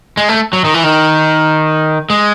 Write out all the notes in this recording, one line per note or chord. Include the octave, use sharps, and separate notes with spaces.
G#3
A3
F#3
D#3
E3
D#3
G#3